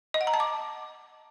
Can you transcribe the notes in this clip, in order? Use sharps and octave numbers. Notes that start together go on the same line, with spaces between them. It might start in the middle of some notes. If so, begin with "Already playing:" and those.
D#5
F#5
A#5
A5
D6